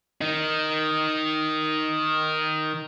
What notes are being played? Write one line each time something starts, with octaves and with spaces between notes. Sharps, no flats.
D#3 D#4